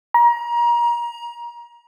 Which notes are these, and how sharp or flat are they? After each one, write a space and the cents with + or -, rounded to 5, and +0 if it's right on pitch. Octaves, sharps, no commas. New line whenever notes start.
A#5 +30